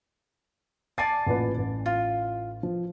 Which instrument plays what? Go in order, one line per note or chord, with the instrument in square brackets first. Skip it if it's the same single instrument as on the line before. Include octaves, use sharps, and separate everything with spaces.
[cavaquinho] D5 G#5 A5 [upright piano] D6 A6 C7
[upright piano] A1 A#2 B4
A1
[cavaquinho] F4
[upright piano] F3